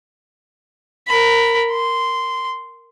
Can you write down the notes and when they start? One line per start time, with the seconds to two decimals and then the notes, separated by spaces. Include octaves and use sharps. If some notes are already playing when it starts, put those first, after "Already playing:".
1.07 A#4 B5
1.72 C6